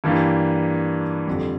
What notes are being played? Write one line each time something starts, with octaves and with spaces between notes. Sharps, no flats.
G2 E3 A#3 D4 G4
F2 D3 G3